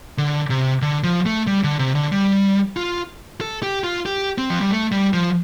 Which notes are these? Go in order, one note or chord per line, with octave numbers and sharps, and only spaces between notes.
D3
C3
D3
F3
A3
G3
D3
C3
D3
G3
F4
A4
G4
F4
G4
C4
F3
G3
A3
G3
F3